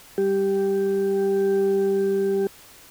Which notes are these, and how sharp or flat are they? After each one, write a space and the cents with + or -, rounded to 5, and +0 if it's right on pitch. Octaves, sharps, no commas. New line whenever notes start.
G3 +0 G4 +0